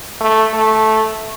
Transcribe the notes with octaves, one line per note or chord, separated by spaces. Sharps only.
A3
A3